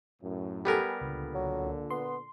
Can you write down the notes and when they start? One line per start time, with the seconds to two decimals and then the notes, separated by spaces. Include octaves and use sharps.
0.22 F#2 A2
0.65 G3 B3 G4 A4 A#4 G#5
1.01 C#2 A#2 D3
1.34 F#3
1.90 B3 C6